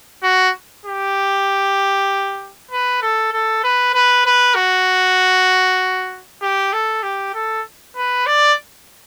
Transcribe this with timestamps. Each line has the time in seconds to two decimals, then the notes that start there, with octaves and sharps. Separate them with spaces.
0.23 F#4
0.86 G4
2.71 B4
3.02 A4
3.33 A4
3.63 B4
3.94 B4
4.26 B4
4.55 F#4
6.42 G4
6.73 A4
7.03 G4
7.35 A4
7.96 B4
8.26 D5